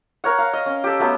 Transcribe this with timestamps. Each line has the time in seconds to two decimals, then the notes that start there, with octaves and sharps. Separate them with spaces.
0.24 A#4 C#5 F#5
0.38 F5
0.53 D#5
0.66 C#4
0.84 G4 A4
0.99 F#3 A3 B3